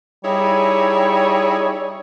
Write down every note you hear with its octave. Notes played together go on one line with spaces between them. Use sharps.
G3 D#4 E4 G#4 C#5